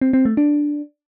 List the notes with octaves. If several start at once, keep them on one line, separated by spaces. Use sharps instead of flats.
C4
C4
A3
D4